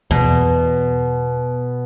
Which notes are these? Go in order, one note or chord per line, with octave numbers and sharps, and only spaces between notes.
E2 B2